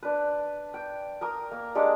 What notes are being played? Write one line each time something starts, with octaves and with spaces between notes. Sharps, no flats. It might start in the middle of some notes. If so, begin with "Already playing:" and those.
D4 B4
G5
A#4 A#5 D#6
A#3
G#3 D4 G4 C#5